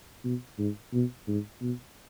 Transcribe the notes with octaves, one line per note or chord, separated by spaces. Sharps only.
B2
G#2
B2
G#2
B2